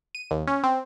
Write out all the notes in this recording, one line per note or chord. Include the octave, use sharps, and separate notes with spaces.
D#7
D#2
C#4
C4